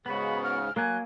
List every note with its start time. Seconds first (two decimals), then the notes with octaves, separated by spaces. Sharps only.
0.06 G#2 C#3 B3 F#4 B5
0.43 F6
0.76 F#3 A#3 G#5 F#6